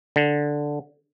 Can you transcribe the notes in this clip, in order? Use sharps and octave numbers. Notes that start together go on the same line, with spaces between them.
D3